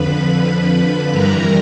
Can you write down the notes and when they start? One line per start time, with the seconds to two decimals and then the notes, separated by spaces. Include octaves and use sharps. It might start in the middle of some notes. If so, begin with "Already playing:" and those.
Already playing: F2 D3 F3 B4 B5
1.12 G2 E3 G3 A#4 A#5